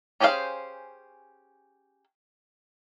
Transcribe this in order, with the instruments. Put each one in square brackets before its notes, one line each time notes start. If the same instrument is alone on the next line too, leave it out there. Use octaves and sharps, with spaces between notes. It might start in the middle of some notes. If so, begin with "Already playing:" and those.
[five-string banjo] C#4 G4 G#4 C5 F5